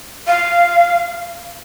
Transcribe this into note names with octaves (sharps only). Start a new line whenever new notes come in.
F5